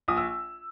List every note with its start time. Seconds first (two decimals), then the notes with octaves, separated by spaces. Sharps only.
0.08 A#1 D#6
0.17 E6